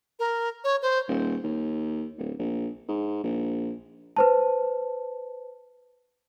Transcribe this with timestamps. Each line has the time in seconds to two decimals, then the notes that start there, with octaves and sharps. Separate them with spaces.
0.19 A#4
0.64 C#5
0.82 C5
1.09 D#1
1.44 D#2
2.18 D1
2.39 A#1
2.89 G#2
3.24 A#1
4.17 B4 C5 A5